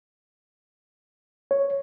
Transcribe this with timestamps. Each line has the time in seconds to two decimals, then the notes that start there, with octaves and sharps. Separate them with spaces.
1.51 C#5